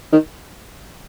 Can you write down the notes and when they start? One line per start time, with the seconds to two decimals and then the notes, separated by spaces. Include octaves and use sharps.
0.12 D#3